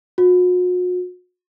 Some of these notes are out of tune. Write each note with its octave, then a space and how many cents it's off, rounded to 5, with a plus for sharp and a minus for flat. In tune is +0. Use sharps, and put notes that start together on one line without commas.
F#4 -40